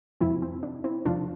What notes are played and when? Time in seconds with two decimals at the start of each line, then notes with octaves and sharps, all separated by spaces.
0.20 F2 C3 F3 C4 E4
0.42 C4
0.63 D4
0.84 C4 E4
1.06 F2 C3 F3 D4 F4